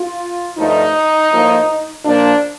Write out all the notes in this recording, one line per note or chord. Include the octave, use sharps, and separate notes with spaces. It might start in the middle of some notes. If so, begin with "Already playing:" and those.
Already playing: F4
G2 F3 A3 D#4
A2 F3 A#3
A#2 F3 A#3 D4